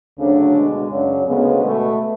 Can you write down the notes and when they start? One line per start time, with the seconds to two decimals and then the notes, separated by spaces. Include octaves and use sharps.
0.18 D2 C#3 F#3 D4
0.54 B2 G#3
0.90 F#2 C#3 F#3 D4
1.26 D2 C#3 G#3 B3
1.62 B2 A3